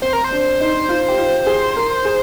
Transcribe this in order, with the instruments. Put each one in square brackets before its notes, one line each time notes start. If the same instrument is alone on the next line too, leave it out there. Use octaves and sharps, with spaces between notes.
[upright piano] C4 [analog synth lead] C5
[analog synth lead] A#4
C5
[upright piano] D4
D#4
F4
G4
F4
G#4
A#4
G#4